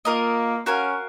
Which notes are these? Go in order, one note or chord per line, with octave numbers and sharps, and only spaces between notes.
A#3 F4 A#4 D#5
C#4 F#4 A#4 F5 G#5